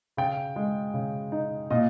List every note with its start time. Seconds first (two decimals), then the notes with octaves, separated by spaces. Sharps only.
0.17 C#3 G5
0.56 G#3
0.94 C#3
1.32 D#4
1.70 A#2 D#5